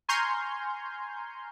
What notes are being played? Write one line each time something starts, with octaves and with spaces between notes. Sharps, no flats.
G#5 A#5 C6 C#6 F6 G6